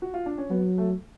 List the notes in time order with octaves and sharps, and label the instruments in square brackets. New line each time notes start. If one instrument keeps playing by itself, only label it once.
[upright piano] F#4
F4
D4
C#4
[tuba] F#3 [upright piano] B3
[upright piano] A3